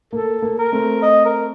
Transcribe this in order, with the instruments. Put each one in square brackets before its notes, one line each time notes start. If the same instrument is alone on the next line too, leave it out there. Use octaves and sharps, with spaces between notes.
[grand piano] A#3 [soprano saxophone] A4
[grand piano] A#3
[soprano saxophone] A#4
[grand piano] A3 C4
[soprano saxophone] D#5
A#4